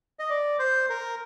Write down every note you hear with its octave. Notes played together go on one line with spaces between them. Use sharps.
D#5
D5
C5
A#4